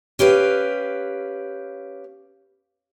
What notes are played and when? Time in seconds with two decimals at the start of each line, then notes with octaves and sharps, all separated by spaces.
0.19 C#4 G4 B4 F5